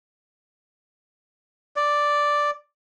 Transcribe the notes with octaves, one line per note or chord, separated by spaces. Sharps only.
D5